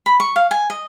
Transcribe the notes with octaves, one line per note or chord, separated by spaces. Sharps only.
B5
C#6
F5
G#5
D#5